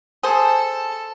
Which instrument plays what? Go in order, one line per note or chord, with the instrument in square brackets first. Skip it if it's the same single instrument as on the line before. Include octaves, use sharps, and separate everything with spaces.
[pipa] G#4 C5 [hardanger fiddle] A4